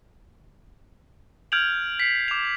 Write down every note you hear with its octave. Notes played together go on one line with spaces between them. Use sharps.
F6 G6 G#6 D7 F7 F#7
B6 C7
D6 F7